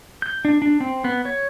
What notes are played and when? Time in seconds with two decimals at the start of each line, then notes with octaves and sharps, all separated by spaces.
0.22 G6
0.45 D4
0.62 D4
0.80 C4
1.04 B3
1.25 C#5